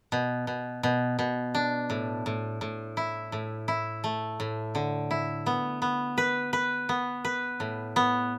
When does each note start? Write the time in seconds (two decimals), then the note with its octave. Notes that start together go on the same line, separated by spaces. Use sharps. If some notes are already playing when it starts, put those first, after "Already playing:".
0.12 B2
0.47 B2
0.83 B2
1.19 B2
1.55 D4
1.90 A2
2.26 A2
2.61 A2
2.97 E4
3.32 A2
3.68 E4
4.04 A3
4.40 A2
4.75 D3
5.11 E4
5.46 B3
5.82 B3
6.18 B4
6.53 B4
6.89 B3
7.25 B4
7.60 A2
7.96 B3